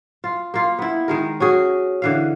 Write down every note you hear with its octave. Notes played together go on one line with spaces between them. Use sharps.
F4
A#3 F4
B3 E4
D#3 G#3 A#4
C#4 F#4 G#4
D3 E3 F5